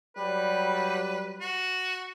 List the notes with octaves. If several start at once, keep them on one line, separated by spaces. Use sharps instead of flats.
F#3 G3 B4
F#4